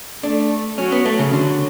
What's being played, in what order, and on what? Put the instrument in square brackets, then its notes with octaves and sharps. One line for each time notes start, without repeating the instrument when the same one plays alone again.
[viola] A3 [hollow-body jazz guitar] D4
[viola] F#3 [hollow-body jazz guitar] C#4
[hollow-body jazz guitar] B3
A3
C#3
[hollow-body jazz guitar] D3 [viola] F#3